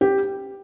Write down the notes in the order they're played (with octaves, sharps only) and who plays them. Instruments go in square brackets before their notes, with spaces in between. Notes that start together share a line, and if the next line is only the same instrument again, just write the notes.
[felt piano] G4